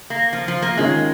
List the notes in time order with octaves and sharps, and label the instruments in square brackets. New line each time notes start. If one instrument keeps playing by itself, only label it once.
[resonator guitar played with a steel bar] A#3
F3
F3
A#3
[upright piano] D#3 C#4 F4 [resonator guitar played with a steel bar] G#3